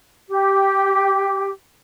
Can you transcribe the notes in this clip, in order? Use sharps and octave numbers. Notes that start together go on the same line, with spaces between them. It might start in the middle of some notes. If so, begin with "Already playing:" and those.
G4